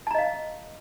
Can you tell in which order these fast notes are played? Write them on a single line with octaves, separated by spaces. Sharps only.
A5 A#5 D#5 F5